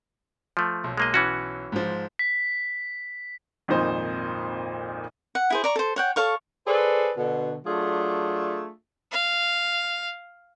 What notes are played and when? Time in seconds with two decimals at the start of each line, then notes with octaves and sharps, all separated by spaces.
0.57 F3 A3
0.84 B1
0.97 G#3 A#3 D#5
1.14 E3 C#4 F#4
1.72 G#2 F3
2.19 B6
3.68 G#1 F2 A#2 D#4 C5
5.35 F#5
5.50 E4 G#4 C5
5.64 D5 A#5 C#6
5.76 A4 C5
5.96 C#5 F#5 G5
6.16 A4 C#5 F5 C#6
6.67 G#4 A4 B4 C5 D5
7.17 B2 D3
7.65 F#3 A3 D4 F4 G#4
9.12 F5